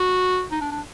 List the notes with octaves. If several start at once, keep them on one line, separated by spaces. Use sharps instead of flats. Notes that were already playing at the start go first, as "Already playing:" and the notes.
Already playing: F#4
D#4
D4
D4